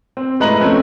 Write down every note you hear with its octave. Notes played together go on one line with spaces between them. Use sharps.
C4
A2 G#3 B4 D#5 A#5 F#7
F3 A3 C4 C#4